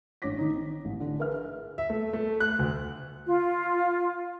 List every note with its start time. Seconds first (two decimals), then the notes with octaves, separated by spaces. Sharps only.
0.22 A1 D4 C#5 D6 A#6 B6
0.38 D#3 D#4
0.53 C4
0.85 A1
1.00 D3
1.19 G#4 A#4 B4 E5 F6
1.78 E5
1.90 A3
2.13 A3
2.40 F#6
2.59 D2
3.26 F4